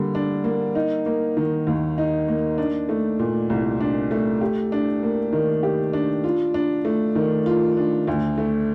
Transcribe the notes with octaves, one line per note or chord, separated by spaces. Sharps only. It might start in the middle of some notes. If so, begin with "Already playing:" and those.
Already playing: D3 G3 A#3
D4
A#3
D#4
A#3
D#3
D#2
D#4
A#3
D4
A3
A#2
C2
D4
A3
G4
D4
A#3
D#3
G4
D4
F4
D4
A3
D#3
F4
D4
D2
A3